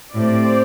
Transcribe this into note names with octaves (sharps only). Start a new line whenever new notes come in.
A2 C4 G4 D5